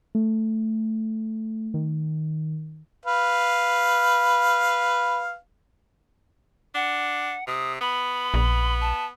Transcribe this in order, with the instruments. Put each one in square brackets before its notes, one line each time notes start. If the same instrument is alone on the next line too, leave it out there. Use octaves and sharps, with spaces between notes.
[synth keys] A3
D#3
[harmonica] B4 F5
[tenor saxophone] D4 [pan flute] F#5
[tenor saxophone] C3 [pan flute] D#6
[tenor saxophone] B3 [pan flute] B5
[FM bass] A#1
[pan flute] A5